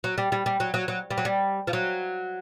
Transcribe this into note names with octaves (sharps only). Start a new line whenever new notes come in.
F#3
G3
G3
G3
F#3
F#3
F#3
G3
F#3
G3
F3
F#3